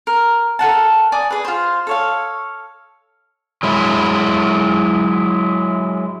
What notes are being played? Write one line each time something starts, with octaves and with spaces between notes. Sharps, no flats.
A#4
A4 A#4 F#5 A5
D5 G#5 D6 D#6
G#4 B4
F4 C5
A4 C#5 F5
F#3 G#3 E4